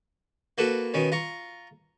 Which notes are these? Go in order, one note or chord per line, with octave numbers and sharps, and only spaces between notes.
A#3 F#4 A4 B4
B2 D#3 C#4
F4 A#5 C#6